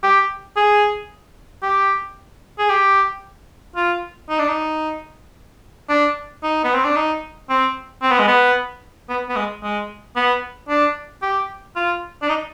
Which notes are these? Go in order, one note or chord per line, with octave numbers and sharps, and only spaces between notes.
G4
G#4
G4
G#4
G4
F4
D#4
D4
D#4
D4
D#4
B3
C4
D4
D#4
C4
C4
B3
G#3
B3
B3
B3
G#3
G#3
B3
D4
G4
F4
D4
D#4